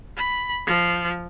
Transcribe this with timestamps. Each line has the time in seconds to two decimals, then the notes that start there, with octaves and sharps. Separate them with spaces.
0.17 B5
0.66 F3